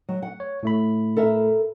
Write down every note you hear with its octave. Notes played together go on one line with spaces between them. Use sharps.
F#3
F#5
C#5
A2 A3 B5
A4 A#4 E5